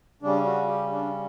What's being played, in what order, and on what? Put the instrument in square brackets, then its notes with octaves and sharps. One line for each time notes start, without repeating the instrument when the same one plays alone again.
[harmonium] C#3 G3 C#4 D4
F#4
G4
D4